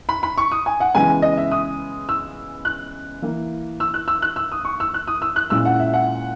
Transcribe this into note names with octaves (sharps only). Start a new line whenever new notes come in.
B5
B5
C#6
D#6
G#5
F#5
C#3 E3 G#3 B3 G#5
D#5
E5
D#6
E6
F#6
E3 A#3 E4
E6
F#6
E6
F#6
E6
D#6
C#6
E6
F#6
D#6
E6
F#6
A#2 G#3 C#4 E4 E6
F#5
E5
F#5